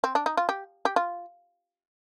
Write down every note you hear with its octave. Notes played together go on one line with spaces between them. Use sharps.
C4
D4
D#4
F4
G4
G4
F4